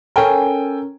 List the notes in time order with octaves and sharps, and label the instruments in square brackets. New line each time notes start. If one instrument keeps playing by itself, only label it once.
[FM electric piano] C#4 A#4 [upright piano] A4 G5 G#5